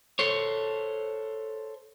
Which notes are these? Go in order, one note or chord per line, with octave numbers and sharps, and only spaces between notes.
A4 C5 C#5